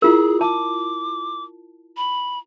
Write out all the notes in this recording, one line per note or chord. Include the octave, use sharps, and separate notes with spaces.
E4 F4 G#4 A#4
A5 D6
B5